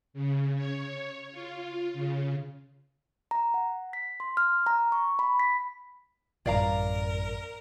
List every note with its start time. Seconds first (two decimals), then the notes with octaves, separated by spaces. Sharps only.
0.13 C#3
0.56 C#5
1.32 F4
1.93 C#3
3.31 A#5
3.54 F#5
3.93 B6
4.20 C6
4.37 F6
4.67 A#5
4.92 C#6
5.19 B5
5.39 B6
6.46 A1 F#2 G3 A#4 D5 F5 A#5